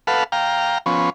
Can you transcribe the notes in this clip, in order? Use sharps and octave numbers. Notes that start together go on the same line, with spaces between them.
A4 B4 F5 F#5
F5 G5 A#5
F3 B3 C#4